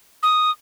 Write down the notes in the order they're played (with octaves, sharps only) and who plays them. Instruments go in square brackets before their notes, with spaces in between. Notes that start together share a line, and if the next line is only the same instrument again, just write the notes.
[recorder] D#6